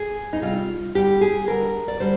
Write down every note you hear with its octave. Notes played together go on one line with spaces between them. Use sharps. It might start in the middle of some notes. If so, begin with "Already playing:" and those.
Already playing: G#4
D#4
C3 G3 F4
D3 G3 G4
G#4
D3 G3 A#4
D5
D3 G3 C5